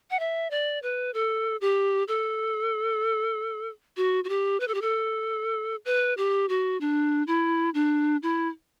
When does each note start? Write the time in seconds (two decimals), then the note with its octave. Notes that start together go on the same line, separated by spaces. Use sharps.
0.11 F#5
0.19 E5
0.51 D5
0.83 B4
1.14 A4
1.61 G4
2.08 A4
3.97 F#4
4.24 F#4
4.29 G4
4.60 B4
4.68 A4
4.74 G4
4.82 A4
5.85 B4
6.17 G4
6.49 F#4
6.81 D4
7.27 E4
7.74 D4
8.23 E4